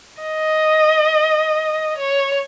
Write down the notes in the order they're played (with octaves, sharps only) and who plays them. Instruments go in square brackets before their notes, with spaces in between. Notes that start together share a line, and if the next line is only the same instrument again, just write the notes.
[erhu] D#5
C#5